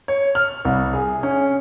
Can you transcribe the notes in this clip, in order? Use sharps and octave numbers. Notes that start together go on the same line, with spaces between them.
C#5
F6
C2
G#4
C#4